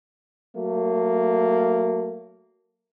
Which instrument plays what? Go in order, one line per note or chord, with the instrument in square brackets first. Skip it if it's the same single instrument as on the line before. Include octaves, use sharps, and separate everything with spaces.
[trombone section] F#3 A3 A#3